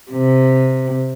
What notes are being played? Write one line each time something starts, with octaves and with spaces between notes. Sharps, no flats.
C3